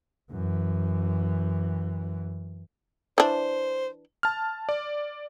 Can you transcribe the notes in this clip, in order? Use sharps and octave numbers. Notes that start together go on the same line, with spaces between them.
F#2 E3
E3 D4 C5
A5 F6
D5